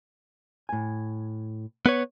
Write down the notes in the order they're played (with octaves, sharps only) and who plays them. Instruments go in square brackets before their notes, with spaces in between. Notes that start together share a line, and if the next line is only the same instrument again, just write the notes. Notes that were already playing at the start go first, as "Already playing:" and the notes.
[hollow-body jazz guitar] A2 G#5
[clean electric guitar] B3 B4 C#5